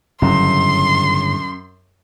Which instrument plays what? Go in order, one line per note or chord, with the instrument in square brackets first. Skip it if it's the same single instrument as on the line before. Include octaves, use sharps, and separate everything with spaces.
[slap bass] G1 A2 C#3 [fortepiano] F#2 [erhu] C6